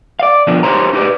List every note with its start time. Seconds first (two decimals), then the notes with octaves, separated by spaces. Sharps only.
0.19 D5 F5
0.47 B2 D3 F3 D4
0.63 D#4 F#4 G4 C5 C#5 A#5
0.93 D#4 G4 B4 D5